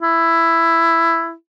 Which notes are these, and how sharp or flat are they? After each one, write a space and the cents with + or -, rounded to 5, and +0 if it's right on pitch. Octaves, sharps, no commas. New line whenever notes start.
E4 +10